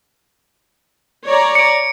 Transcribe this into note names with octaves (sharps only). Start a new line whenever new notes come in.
C#5 D5 A#5
C#7 D7